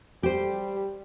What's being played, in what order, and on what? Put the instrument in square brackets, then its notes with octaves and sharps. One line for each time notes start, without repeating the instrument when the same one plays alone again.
[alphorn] G3 [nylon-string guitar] G4 C5